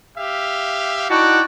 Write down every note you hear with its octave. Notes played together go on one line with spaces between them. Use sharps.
G4 E5 F5
D#4 E4 F#4 D5 G5 A5